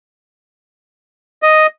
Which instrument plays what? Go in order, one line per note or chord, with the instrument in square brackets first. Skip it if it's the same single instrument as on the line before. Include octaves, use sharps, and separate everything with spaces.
[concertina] D#5